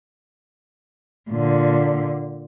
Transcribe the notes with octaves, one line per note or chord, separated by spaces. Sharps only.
A#2 D3